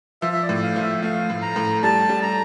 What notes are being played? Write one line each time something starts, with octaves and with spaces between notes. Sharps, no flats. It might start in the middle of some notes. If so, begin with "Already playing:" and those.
F3 E5
E5
D5
A2
F5
F3
E5
A3 F5
A2
A#5
A2
G3 A5
G3
A#5